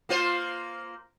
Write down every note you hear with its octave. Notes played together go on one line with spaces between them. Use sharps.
A#3 F4 C5